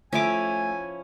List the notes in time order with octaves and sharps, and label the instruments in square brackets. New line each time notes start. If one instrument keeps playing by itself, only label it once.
[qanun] F3 C#6 D6 [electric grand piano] A3 E5 [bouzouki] C#4 E4 [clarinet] G#5